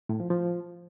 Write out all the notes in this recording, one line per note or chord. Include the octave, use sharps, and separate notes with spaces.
A2
F3
F3